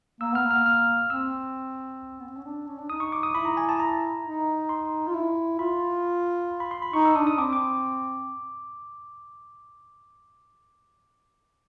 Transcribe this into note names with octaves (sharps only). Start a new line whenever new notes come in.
A#3 E6
B3 F6
A#3
F6
F6
C4 E6
B3
C4
C#4
D4
C#4
D4
D#4 D#6
C#6
D6
D#6
E4 B5
A#5
G#5
A5
A#5
D#4
C6
F4
E4
F4 B5
B5
C6
B5
D#4 C#6
E6
D4 D#6
D#6
C4 D6
D6